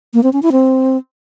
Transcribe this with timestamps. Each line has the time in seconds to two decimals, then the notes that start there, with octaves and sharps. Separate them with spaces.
0.14 A#3
0.23 C4
0.33 C#4
0.43 E4
0.52 C4